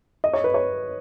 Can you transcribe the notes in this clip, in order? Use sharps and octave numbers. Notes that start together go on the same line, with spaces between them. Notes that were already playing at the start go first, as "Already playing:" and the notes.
D#5
C#5
B4
C#5